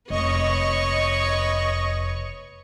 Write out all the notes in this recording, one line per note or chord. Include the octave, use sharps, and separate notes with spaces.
F1 B4 C#5 D#5 C#6